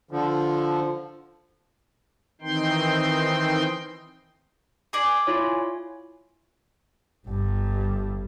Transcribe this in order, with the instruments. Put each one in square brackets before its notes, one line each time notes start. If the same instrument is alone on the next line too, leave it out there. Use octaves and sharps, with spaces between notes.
[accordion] D3 F3
[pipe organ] D#3 E3 C4 D#4 G5 C6
[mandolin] G#4 D5
[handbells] E4 F4 C#5
[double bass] G1 G2